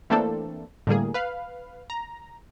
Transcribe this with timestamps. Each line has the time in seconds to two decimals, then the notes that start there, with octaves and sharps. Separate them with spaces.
0.10 E3 A3 A#3 C4 D4 A4
0.87 A2 D3 G3 A#3 G#4
1.14 B4 F5
1.90 A#5